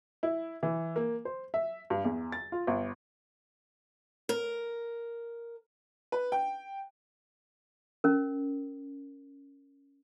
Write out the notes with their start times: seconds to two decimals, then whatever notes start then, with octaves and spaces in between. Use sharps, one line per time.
0.23 E4
0.63 E3
0.96 A#3
1.25 C5
1.54 E5
1.90 G2
2.04 E2
2.32 A6
2.52 F4
2.67 G1
4.29 A#4
6.12 B4
6.32 G5
8.04 C#4 A#4